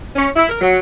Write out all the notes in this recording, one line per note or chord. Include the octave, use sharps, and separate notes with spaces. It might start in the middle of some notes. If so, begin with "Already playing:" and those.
C#4
E4
A#4
F#3